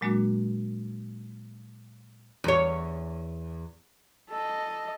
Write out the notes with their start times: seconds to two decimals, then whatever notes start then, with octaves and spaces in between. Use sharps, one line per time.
0.01 A#2 F#3 G#3 A#3 D4 F#4
2.44 E2 C#5
4.30 A4 D#5